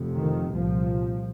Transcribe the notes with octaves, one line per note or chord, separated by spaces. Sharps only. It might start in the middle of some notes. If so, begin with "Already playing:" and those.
Already playing: F1 F2 C3
D#3
C2 A#2 F3